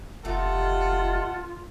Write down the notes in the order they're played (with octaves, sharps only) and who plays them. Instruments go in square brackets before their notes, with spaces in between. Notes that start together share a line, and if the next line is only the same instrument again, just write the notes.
[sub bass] F1 [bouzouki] A3 D#4 G4 [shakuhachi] F4 [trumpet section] A4 F#5